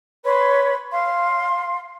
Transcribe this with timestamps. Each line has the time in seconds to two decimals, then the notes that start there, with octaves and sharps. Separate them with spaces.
0.25 B4 C#5 B5 C6
0.90 F5 C6